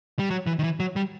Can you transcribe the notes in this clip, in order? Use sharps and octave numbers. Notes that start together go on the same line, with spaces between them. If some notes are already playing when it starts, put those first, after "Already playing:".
G3
F#3
E3
D#3
E3
F#3
G3